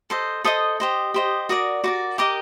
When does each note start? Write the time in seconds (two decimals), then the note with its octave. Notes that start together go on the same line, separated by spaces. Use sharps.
0.10 A4 C5 D#5
0.44 A4 C5 D#5 D#6
0.80 G4 C5 D#5
1.14 G4 C5 D#5
1.49 F#4 A#4 D5 D#6
1.84 F#4 A#4 D5 D6
2.18 G4 A#4 D#5 D6